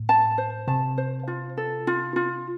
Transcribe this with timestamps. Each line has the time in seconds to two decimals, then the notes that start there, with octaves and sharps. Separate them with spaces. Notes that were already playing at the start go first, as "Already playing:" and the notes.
Already playing: A2
0.09 A5
0.38 C5
0.68 C3 A5
0.98 C5
1.28 F4
1.57 A4
1.87 F4
2.16 F4